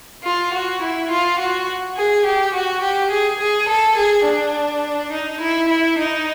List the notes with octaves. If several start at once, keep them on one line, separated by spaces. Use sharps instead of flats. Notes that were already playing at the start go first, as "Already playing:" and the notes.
F4
F#4
E4
F4
F#4
G#4
G4
F#4
G4
G#4
G#4
A4
G#4
D4
D#4
E4
E4
D#4